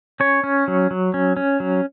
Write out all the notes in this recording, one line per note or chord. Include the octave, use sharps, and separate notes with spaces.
C#4 C#5
C#4
F#3
F#3
C#4
C#4
F#3